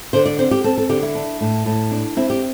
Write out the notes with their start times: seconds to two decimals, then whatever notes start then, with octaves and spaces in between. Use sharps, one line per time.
0.13 D3 C5
0.26 D5
0.39 C4 C5
0.51 G4
0.64 C4 A4
0.78 A4
0.89 D3 G4
1.03 E4
1.15 D4
1.41 A2
1.66 A2
1.91 D4
2.17 C4 E4
2.30 G4